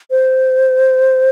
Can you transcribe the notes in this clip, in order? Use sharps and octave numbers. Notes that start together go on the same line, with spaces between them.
C5